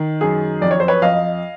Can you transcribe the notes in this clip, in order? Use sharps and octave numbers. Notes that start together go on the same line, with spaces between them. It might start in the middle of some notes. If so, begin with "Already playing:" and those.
Already playing: D#3
F#2 G#4
F2 D5
C#5
C5
B4 C#5
F2 D#5 F5